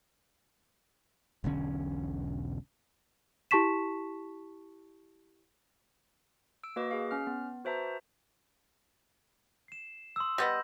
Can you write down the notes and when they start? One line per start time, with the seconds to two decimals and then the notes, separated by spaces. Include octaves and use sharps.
1.44 E1 B1 D3 C#4
3.51 E4 G4 A5 C#6 B6 E7
6.64 E6 D7
6.76 A#3 F#4 B4 D#5 D6
6.91 G#4 F5
7.11 C#4 F6
7.27 B3
7.64 F#4 B4 C5 E5 A5 A#5
9.68 C7 E7
10.16 C6 D#6 E6
10.38 G3 B3 D#5 C6 G6 A#6